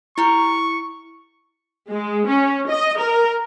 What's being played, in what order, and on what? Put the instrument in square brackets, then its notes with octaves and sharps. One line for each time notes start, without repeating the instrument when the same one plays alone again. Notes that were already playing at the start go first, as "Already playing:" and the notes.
[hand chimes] E4 [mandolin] G4 A#4 [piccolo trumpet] C#6
[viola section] G#3
C#4
D#5
A#4